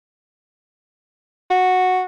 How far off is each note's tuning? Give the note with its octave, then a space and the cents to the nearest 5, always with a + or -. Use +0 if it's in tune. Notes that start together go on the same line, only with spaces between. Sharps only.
F#4 -5